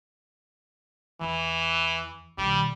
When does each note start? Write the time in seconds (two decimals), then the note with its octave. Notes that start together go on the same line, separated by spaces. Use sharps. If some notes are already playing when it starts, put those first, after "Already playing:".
1.21 E2 E3
2.38 B1 D#3 G3